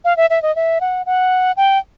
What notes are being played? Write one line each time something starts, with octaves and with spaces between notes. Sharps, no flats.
F5
E5
E5
D#5
E5
F#5
F#5
G5